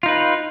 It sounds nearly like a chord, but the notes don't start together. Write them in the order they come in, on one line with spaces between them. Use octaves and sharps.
F4 D#4 B4